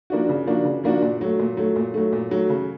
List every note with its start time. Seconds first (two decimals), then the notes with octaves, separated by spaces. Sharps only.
0.10 F3 A#3 D4 F#4
0.29 C#3
0.47 F3 A#3 D4 F#4
0.65 C#3
0.84 F3 A#3 D4 F#4
1.02 A#2
1.21 F#3 A3
1.39 A#2
1.57 F#3 A3
1.76 A#2
1.94 F#3 A3
2.13 A#2
2.31 F#3 A3
2.49 C#3